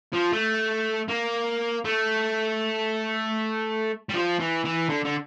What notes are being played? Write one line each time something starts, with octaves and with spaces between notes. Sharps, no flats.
F3
A3
A#3
A3
G3
F3
E3
E3
D3
D3